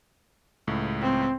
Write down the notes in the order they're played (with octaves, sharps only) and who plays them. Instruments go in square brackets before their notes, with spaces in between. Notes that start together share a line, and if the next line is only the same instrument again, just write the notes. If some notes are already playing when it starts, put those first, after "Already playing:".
[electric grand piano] C#2 A2
[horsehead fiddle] C4